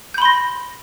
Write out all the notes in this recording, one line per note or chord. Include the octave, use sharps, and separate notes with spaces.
B5 C6 G6 A#6